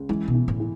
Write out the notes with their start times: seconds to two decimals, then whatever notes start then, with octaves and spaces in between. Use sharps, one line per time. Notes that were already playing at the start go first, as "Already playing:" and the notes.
Already playing: C#2
0.09 E3 G#3
0.28 B2
0.35 E3
0.48 A2
0.60 E3